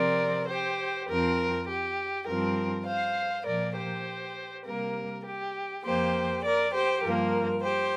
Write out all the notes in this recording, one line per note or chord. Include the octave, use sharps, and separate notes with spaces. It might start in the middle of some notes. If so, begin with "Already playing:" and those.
Already playing: C3 F3 C4 A#4 D5
G4 C5
F2 F3 C4 A#4
G4
G2 F3 C4 A#4
C5 F5
A#2 F3 A#3 A#4 D5
G4 C5
C3 G3 A#3 A#4
G4
F2 F3 A#3 G4 C5
A#4 D5
G4 C5
G2 F3 A#3 A#4
G4 C5